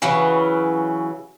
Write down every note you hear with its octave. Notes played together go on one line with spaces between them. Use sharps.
C#3 E3 F#3